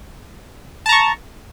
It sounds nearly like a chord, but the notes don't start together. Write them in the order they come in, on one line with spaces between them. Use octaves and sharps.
A5 A#5 C#6